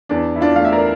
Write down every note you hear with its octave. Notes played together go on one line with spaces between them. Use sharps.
E2 D4
E4
D4 F4
A3 F5
E5
A#4 D5